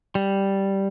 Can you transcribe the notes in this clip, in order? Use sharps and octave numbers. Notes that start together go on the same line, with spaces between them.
G3